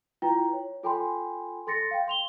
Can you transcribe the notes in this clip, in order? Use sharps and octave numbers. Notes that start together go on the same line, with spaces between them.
E4 F4 B4 G5 A#5
C#5
F4 A4 G5 G#5 B5 C6
A4 C6 A6 A#6 C#7
F5 G5
C6 F7 G7